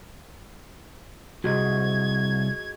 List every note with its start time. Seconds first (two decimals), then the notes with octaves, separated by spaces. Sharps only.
1.44 C2 F#4 G#4 D#5 G#6